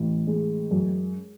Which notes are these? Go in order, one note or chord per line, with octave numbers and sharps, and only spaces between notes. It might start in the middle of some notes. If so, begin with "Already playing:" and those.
Already playing: A1
G#3
F#2